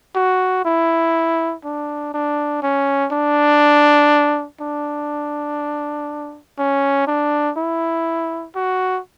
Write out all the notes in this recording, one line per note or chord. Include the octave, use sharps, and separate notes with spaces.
F#4
E4
D4
D4
C#4
D4
D4
C#4
D4
E4
F#4